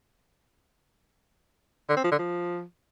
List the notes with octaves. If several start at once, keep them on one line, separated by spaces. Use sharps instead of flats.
D3
C4
F3
D3
F3